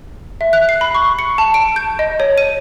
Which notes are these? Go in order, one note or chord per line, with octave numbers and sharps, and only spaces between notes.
E5
F#6
C7
B5
C#6
C#7
A5
D7
G6
D#5
C#5
D#7